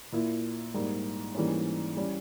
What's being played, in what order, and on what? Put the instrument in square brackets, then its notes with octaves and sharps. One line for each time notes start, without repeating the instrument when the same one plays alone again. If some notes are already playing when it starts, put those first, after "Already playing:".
[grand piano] A#2 A#3 E4
G#2 G3 A#3
G#2 E3 G3 A#3 C#4
G3 C#4 E4